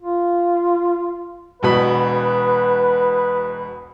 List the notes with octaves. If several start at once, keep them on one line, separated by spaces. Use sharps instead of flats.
F4
E1 B2 B4 B5